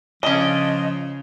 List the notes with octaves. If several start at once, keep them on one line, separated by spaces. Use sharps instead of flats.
C#3 F3 C#4 D4 D#5